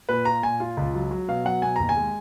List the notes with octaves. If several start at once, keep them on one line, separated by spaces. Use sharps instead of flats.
A#2 B4
F4 A#5
A#2 G#5
F4
C#2
F#3
F#3
B2 F5
F#3 F#5
B2 G#5
D#2 A#5
G#5
G#3